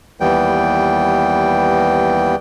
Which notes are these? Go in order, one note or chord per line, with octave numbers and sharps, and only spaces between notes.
D#2 E3 G3 B3 G5